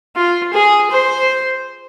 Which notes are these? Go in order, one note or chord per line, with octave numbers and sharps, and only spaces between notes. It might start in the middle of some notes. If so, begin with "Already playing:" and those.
F4
G#4
C5